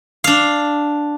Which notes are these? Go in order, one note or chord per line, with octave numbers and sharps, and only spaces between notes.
D4 F5